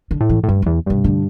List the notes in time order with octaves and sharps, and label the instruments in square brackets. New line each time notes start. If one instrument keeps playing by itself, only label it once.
[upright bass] D3
[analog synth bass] A2
[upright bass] E3
[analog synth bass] A2
[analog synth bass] G2 [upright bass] G3
[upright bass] G3
[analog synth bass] E2
[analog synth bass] G2 [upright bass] C3
[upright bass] D3